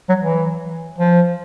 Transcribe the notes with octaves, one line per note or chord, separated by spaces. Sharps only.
F#3
E3
F3